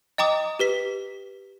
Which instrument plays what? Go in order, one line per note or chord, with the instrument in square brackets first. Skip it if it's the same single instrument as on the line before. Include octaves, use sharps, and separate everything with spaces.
[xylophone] D#5 G5 A#5 D6 D#6
G4 B4 B6